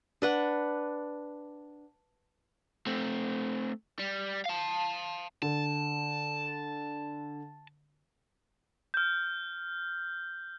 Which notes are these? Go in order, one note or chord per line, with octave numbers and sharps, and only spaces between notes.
D4 B4 F#5
A3 C4
G3
F5 A5
D3 A5
F6 G6